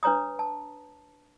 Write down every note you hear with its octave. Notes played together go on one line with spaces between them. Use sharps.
D4 B4 C#5 A#5 D#6
A5